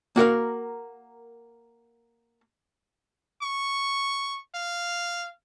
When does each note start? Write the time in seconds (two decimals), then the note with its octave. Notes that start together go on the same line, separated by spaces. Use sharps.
0.16 A#3 F#4 A#4 F5
3.42 C#6
4.55 F5